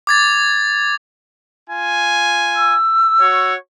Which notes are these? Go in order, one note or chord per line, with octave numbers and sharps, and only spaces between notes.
D6 G#6 A6
F4 G#5
E6
F#4 C#5